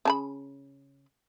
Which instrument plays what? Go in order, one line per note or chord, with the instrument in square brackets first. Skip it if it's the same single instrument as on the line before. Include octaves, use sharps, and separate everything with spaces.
[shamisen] C#3 A5 B5